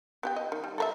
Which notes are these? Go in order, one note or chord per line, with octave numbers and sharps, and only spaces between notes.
B3 G4 G5
D#5
D#3
G3
A4 A#4 E5